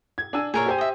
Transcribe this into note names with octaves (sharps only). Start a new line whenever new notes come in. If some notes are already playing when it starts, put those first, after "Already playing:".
G#6
D4 G#5 E6
A#2 G#4 A#4 C#5
G4 C5 G#5
D#5 E5